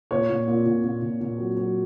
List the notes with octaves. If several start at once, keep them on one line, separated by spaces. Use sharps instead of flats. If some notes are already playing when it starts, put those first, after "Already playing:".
A#2 C#5
A#2
A#2
A#2
A#2
A#2
A#2
F#3
F#3